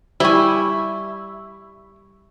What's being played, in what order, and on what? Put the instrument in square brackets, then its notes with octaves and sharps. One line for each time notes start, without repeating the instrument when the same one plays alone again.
[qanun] G3 G#5 [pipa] E4 [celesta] C#6 G7